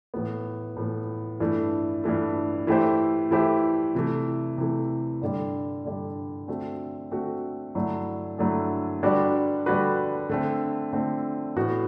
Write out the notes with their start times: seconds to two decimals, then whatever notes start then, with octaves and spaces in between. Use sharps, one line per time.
0.14 A2 E3 B3
0.76 A2 E3 B3
1.40 G2 E3 A3
2.04 G2 E3 A3
2.67 E3 A3 E4 G4 C5
3.31 E3 A3 E4 G4 C5
3.95 C3 E3 A3
4.58 C3 E3 A3
5.21 G2 D3 G3
5.84 G2 D3 G3
6.48 D3 A3 C4 F#4
7.11 D3 A3 C4 F#4
7.75 G2 D3 F#3 A3 E4
8.38 G2 D3 F#3 A3 E4
9.02 D3 G3 D4 F#4 B4
9.66 D3 G3 D4 F#4 B4
10.29 D3 A3 C4
10.93 D3 A3 C4
11.56 A2 E3 B3 F#4